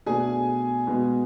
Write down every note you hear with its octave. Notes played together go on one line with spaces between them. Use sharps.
B2 A3 D4 G#4 G#5
B2 G#3 B3